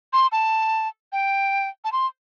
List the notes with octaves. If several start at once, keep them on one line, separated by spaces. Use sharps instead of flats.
C6
A5
G5
A5
C6